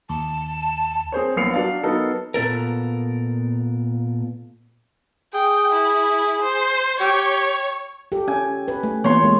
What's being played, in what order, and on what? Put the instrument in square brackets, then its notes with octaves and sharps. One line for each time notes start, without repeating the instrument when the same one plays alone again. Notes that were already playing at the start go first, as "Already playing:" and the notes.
[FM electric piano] D#2 [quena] A5
[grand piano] C4 G#4 C5 C#5
A#1 A#3 B3 C7 C#7 F7
F#3 D4 F5
F#3 B3 D#4 A4 A#4
[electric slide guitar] A#2 B3 A4 A#4
[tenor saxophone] G#4 [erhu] G5
[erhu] E4
C5
[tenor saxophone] G4 [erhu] C#5
[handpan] G4 A4
[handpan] C#4 [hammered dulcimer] G#5
[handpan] B4
A3
[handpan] E3 A#3 B3 [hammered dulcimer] C#5 C6
[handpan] G#3 A#3